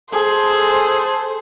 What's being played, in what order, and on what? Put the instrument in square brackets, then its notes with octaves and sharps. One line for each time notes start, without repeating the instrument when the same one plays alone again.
[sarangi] G#4 [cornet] A4 [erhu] C5